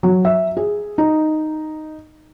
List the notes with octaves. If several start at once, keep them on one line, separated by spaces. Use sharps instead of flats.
F#3
E5
G#4
D#4